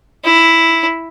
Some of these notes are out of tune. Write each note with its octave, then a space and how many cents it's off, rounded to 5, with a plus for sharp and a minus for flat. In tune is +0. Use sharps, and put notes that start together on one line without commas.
E4 +0